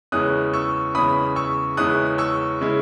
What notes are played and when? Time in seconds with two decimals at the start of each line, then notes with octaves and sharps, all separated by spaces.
0.12 E2 C#3 G#3 C#4 E4 D#6 F#6
0.53 C#6 E6
0.95 E2 C#3 G#3 C#4 E4 B5 D#6
1.36 C#6 E6
1.77 E2 C#3 G#3 C#4 E4 D#6 F#6
2.18 C#6 E6
2.61 C#3 G#3 C#4 E4